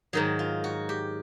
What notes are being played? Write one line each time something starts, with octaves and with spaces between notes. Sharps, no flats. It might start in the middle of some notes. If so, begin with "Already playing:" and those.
G#2 D#3 F#3 D#4
F4
F#4
G4